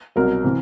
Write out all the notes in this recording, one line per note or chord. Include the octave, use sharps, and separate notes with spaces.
C2 B2 F#3 A#4
C3 E3